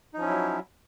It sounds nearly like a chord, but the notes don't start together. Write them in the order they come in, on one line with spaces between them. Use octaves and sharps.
D#4 F3 C#4 E4 F#3